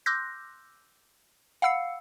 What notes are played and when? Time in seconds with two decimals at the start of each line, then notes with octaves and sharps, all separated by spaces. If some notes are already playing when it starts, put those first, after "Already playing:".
0.06 C6 D6 E6 F#6 G6 A#6
1.62 F5 F#5 B5 E6 C7 C#7